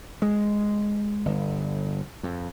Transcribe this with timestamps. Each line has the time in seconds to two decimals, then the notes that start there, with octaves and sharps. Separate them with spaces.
0.22 G#3
1.26 G1
2.23 F2